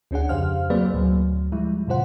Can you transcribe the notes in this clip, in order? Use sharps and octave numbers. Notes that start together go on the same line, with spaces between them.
D2 C#4 D4 G#4 F#5
F2 C#3 G4 C5 F5 F6
F#3 A#3 C4 G#4 B4 D5
D2 A2 F#3
F3 G3 G#3 E4
F#2 A#2 C#3 F4 C5 F#5